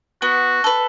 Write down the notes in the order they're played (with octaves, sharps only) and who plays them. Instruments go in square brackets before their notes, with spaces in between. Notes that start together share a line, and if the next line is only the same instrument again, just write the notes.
[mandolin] B3 [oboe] F#4
[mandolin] A4 B4